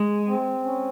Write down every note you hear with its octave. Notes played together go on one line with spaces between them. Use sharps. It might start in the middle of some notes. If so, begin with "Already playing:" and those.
Already playing: G#3
C4
C#4